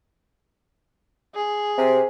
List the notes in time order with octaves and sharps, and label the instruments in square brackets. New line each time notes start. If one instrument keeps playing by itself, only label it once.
[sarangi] G#4
[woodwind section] C3